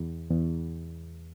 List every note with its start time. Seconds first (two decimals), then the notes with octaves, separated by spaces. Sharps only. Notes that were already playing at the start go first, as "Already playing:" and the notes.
Already playing: E2
0.31 E2